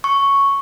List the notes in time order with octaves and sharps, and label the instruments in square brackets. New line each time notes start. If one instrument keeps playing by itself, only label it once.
[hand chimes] C#6